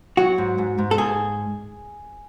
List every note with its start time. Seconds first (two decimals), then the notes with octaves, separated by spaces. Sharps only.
0.17 F#3 F#4
0.38 G#2
0.58 G#2
0.78 G#2
0.91 A4
0.98 G#2 G#4